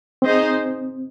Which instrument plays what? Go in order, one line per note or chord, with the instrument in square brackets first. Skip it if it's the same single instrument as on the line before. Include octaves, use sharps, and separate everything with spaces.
[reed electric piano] C4 [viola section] D#4 G#4 C5 D#5